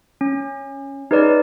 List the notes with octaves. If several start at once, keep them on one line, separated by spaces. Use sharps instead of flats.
C#4
D#4 G#4 B4 C#5 D5